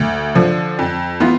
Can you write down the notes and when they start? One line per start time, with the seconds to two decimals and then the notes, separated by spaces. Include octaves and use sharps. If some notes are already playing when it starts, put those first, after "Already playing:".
Already playing: D2
0.35 D3 F3
0.79 F2
1.20 E3 B3 F4